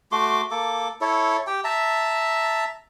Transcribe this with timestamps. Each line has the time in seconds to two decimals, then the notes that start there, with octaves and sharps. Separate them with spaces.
0.12 A3 F#4 C6 D6
0.51 A#3 A4 D6
1.01 E4 A4 C#5
1.47 G4 G5
1.64 E5 A5 A#5